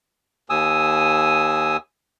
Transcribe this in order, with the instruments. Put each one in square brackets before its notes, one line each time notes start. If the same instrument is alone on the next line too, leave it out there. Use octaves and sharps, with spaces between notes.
[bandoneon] D#2 G#5 D#6 E6